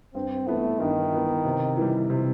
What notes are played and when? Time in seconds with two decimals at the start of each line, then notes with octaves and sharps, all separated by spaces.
0.14 G2 C4
0.47 E3 A3 B3
0.80 G2 D#3
1.12 E3 B3
1.45 C3
1.77 E3 G3
2.10 C3